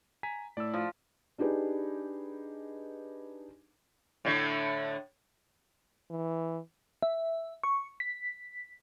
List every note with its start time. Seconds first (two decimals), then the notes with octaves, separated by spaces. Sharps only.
0.23 G#5 A#5 B6
0.57 A2 D5 E6
0.74 F3
1.38 D4 D#4 G4 G#4 B4
4.25 A2 D3 A3
6.10 E3
7.03 E5
7.64 C#6
8.00 B6